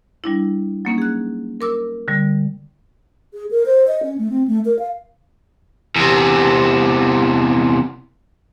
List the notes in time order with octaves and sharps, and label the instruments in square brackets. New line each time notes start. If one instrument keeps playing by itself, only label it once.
[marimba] G3 D4 E4
F#3 A#3 C#4 D#4
G#4 F#6
A#4 D6 E6
D3 G3
[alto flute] G#4
A#4
C5
D#5
C#4
A3
C4
A3
A#4
F5
[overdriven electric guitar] E2 C3